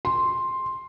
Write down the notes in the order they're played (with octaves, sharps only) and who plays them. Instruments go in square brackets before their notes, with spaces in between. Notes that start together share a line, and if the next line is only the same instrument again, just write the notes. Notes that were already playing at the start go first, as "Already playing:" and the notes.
[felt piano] C6